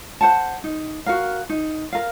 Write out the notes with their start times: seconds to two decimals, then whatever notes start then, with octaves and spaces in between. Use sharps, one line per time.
0.21 C5 F#5 A5
0.64 D#4
1.06 F#4 A#4 F5
1.49 D#4
1.93 A#4 F5